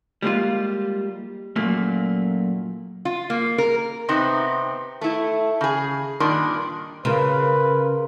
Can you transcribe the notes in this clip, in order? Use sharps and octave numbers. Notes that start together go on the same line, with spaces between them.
G3 G#3 A#3 F4
F#2 A#2 A3 A#3
F4
A#3
A#4
C3 B3 C4 D#4
A3 E4
C#3 G#4
G2 A#2 D#3 D4
C#3 F4 A#4 B4